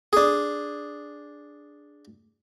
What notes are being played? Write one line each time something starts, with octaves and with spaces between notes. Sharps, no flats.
D4 G#4